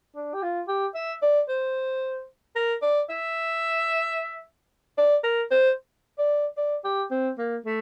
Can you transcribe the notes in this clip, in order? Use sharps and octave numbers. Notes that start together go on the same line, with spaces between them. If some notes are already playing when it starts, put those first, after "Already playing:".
D4
G4
F4
G4
E5
D5
C5
A#4
D5
E5
D5
A#4
C5
D5
D5
G4
C4
A#3
A3